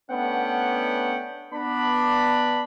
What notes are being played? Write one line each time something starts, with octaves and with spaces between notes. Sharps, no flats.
A3 B3 C#4 D4 F#5 G5
B3 D4 B5